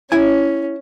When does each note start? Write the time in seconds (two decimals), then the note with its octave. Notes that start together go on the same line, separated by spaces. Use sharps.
0.12 C#4 E4 G#5